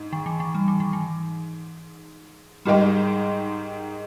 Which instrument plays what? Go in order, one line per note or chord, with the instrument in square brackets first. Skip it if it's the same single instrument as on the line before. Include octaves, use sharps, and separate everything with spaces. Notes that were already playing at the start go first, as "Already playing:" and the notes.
Already playing: [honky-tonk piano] G#2
[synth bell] D#3
E3
D#3
G3
E3
D#3
E3
[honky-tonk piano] G#2 D#3 G#3 D#4 G4 [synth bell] G3